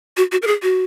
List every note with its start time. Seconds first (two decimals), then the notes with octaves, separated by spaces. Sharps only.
0.17 F#4
0.32 F#4
0.42 A#4
0.47 G#4
0.63 F#4